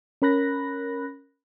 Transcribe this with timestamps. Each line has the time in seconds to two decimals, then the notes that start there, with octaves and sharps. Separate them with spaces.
0.22 C#4 A#4 B5 F#6 A#6